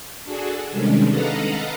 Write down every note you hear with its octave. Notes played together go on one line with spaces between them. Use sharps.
D4 F#4 G#4 A4
C3 D#3 G3 G#3 C#4 D4
A4 B4 D#5 F5 F#5 A#5